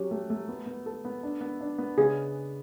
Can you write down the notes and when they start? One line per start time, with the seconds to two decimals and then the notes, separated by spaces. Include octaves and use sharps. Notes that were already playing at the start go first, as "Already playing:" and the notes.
Already playing: F#3 C#4 G4
0.11 A3
0.30 A3
0.48 B3
0.66 B3
0.86 A4
1.05 B3
1.23 D4
1.41 B3
1.61 D4
1.78 B3
1.98 C#3 G#4